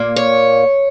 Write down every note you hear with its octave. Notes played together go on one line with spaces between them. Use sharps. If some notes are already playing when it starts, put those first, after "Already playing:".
Already playing: A#2 A#3
C#5